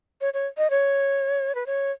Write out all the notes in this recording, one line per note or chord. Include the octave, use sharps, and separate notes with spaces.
C#5
C#5
D#5
C#5
B4
C#5